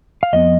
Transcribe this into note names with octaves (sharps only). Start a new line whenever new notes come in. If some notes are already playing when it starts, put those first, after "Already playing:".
F5
F2 F3 B3 D#5